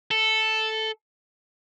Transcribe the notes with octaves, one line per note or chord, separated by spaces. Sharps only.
A4